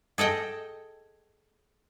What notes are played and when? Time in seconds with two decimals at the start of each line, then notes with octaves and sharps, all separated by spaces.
0.18 G#4 A4 D#5 G5